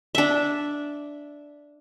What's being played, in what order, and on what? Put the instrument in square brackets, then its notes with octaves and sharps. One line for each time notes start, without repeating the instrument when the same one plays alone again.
[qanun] D4 E5